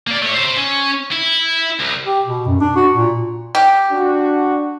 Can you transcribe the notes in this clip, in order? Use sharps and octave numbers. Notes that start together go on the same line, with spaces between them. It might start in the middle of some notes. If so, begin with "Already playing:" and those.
A#3 D5
A3 C#5
C5 E5
C#4
E4
C2
G4
B2
F#2
D4
F#4
A#2
G4
D4 F#4